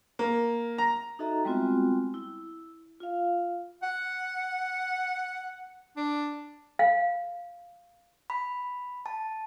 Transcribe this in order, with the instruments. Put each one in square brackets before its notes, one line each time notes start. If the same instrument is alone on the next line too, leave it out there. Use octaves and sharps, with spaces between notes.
[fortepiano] A#3
A#5
[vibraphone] D#4 F#4 A4 D#5 E5 A#5
G3 G#3 B3 C4 F4 F#4
E4
F4 F5
[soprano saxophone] F#5
D4
[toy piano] F5
[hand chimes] B5
A5